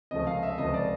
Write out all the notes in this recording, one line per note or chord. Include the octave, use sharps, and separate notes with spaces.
C#2 C3 F3 A3 D#5
F5
E5
C#2 C3 F3 A3 D#5
D5